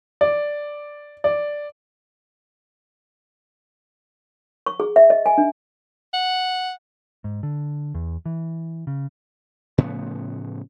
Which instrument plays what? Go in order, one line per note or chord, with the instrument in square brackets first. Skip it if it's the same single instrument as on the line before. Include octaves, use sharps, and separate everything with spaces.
[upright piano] D5
D5
[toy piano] C#6
G#4
E5
D#5
G#5
D4
[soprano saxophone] F#5
[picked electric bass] G#2
D3
E2
E3
C#3
[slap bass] A2 C#3 F3 B3